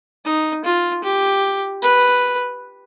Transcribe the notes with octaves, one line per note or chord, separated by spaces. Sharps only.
D#4
F4
G4
B4